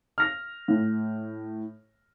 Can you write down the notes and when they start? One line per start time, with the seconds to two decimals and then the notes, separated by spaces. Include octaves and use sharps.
0.18 F6 A#6
0.68 A2